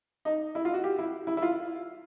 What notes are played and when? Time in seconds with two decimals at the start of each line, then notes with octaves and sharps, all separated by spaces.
0.25 D#4
0.55 E4
0.65 F4
0.74 F#4
0.84 G4
0.98 E4
1.27 E4
1.37 E4
1.42 F4